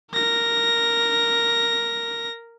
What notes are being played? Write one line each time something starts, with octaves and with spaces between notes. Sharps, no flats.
A#4 A#6